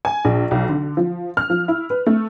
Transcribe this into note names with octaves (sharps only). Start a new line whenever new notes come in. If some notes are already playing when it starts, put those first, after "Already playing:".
G#5
A#1
B1
D3
F3
F6
F3
E4
B4
A3